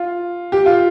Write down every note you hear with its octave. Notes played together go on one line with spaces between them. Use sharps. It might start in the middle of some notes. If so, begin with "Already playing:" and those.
Already playing: F4
G4
F4